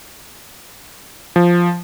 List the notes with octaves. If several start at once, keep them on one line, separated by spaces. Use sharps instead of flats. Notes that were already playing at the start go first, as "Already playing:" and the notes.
F3